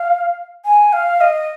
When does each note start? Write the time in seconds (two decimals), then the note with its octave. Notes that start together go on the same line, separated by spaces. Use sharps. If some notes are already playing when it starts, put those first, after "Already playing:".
Already playing: F5
0.65 G#5
0.93 F5
1.21 D#5